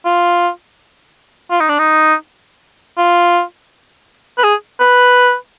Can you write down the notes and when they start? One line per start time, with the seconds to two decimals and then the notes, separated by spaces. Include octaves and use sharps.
0.05 F4
1.51 F4
1.61 D#4
1.69 D4
1.79 D#4
2.98 F4
4.38 B4
4.44 G#4
4.80 B4